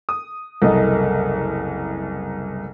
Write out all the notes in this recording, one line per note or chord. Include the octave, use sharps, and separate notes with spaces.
D#6
F#1 C2 A4 A#4 D#5